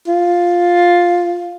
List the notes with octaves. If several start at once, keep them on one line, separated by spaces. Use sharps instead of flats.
F4